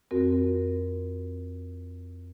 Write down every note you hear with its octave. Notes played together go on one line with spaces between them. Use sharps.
F2 C4 F#4 A#4